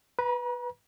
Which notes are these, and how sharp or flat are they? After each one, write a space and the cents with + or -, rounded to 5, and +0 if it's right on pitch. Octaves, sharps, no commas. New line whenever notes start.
B4 +0 A#5 +45